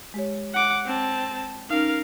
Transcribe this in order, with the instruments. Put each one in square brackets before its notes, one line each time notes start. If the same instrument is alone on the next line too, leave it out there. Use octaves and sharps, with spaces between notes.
[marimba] G#3 G4 C#5
[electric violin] F#5 D6
C4 A5
[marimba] C#4 D#4 [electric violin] A#4 F5